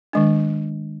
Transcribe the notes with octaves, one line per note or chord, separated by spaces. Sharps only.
D#3 G#3 D4